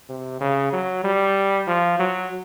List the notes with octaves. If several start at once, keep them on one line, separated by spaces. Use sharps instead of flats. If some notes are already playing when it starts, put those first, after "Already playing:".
C3
C#3
F#3
G3
F3
F#3